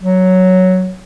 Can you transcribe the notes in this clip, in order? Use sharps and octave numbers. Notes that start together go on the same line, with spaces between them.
F#3